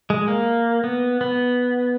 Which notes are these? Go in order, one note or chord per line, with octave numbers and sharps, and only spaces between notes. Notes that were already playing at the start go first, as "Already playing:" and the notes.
G#3
A#3
B3
B3